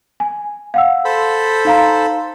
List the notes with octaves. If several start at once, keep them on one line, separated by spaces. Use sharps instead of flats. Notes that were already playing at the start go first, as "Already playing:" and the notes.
G#5
F5 F#5 E6
A4 C5 B5
D#4 F5 A#5